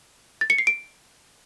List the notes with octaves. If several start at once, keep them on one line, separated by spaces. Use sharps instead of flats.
A6
C#7
C7
D7